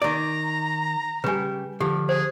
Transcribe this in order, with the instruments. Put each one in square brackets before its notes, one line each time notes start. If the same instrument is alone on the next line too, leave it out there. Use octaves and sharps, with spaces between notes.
[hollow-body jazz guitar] D#3 D5 [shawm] A#5
[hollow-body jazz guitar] C#3 G3 [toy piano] B4 G#5
[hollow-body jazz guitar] D3 F3 [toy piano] G4
[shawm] G#4 [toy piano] C5